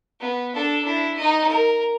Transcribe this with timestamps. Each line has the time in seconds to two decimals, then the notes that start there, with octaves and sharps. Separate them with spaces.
0.20 B3
0.53 D4 A4
0.83 D4 E4
1.17 D#4 D#5
1.48 A#4